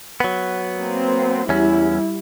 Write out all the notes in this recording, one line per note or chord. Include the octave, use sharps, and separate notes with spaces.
F#3 B3
A#3 C4
E2 G3 C#4 E4